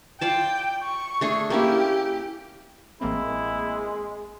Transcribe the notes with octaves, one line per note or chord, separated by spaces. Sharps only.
F4 D5 G5 A5
C#6
A3 D4 G#4
A#3 C#4 E4 G4
A1 G#3 A#3 C4 E4